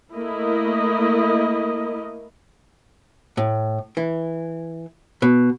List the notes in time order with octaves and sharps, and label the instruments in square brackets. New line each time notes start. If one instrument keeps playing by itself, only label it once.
[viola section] A3 A#3 E4 A#4 D#5
[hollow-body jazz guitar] A2
E3
B2